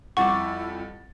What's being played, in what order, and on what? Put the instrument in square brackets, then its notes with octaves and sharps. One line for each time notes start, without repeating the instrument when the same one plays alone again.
[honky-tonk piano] F2 G3 A6 [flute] E4 [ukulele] F#5 [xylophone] C#6 D6